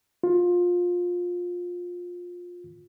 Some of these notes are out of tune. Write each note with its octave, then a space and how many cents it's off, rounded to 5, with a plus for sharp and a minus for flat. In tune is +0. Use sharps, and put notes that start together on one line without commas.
F4 +20